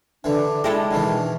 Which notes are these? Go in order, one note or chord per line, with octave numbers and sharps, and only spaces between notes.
D3 E3 D4
G#3 E4 G4 A4
B2 D#3 E3